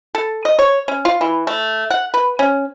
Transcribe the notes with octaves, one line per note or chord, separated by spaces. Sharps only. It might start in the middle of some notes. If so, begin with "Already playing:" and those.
A4
D#5
C#5
C#4
F4
E3
A3
F#5
B4
C#4